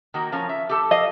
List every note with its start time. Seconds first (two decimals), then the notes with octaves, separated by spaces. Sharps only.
0.14 D#3 A#3 F#4
0.32 F3 C#4 A#4
0.49 E5
0.69 G4 A4 A5
0.91 D#5 F5